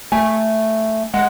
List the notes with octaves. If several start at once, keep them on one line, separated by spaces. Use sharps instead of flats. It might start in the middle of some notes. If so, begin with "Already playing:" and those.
A3 G#5
G#3 F#5